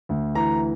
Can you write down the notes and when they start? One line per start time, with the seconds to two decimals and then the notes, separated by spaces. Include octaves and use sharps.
0.09 D2
0.35 E3 A#5